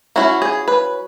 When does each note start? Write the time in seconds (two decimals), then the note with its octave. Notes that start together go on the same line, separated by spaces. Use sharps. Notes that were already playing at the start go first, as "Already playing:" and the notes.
0.16 F#3 C#4 E4 F#4
0.42 G#4
0.68 B4